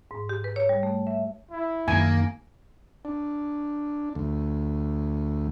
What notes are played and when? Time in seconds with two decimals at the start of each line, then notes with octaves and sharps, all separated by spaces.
0.11 G#2
0.29 G4
0.44 B4
0.56 C#5
0.69 G3
0.83 A3
1.07 E5
1.51 E4
1.88 F#2 D#3 A#3 G#5
3.05 D4
4.15 D2